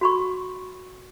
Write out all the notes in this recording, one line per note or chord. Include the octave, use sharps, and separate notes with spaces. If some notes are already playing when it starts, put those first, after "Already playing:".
F#4 B5 C#6